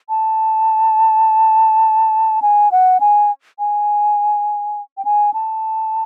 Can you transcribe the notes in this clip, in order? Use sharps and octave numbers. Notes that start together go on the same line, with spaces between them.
A5
G#5
F#5
G#5
G#5
G5
G#5
A5